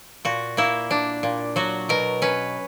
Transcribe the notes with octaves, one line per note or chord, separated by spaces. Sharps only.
A#2 F#4
A#3 E4
D4
A#2
F#3 F#4
B2 A#4
C#4 B4